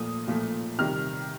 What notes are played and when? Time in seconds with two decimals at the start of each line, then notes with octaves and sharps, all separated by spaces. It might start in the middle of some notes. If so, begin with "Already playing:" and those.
Already playing: A#2 F3 A3 D#6
0.27 A#2 F3 A3
0.79 C3 D#3 G3 F6